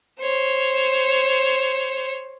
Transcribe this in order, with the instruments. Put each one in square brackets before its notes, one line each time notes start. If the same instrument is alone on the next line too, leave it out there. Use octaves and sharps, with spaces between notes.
[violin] C5 C#5